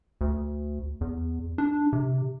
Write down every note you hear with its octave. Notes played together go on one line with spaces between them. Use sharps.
D2
E2
D4
C3